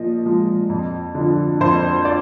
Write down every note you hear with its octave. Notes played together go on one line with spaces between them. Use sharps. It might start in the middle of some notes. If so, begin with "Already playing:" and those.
Already playing: A#2 F3 D#5
F3 G#3
F2
D3
F3
F2 C5
D5